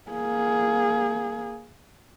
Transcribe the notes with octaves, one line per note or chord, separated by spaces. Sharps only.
A#3 G#4